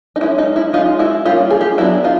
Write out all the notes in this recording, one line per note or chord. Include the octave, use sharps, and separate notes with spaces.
D#4
G#3 C#4 E4
D#4
E4
G#3 C#4 D#4 F4
E4 F#4
G3 A#3 C#4 F4 G4
G#4
F4 G4
F#3 B3 D4 E4 F#4
D#4 F4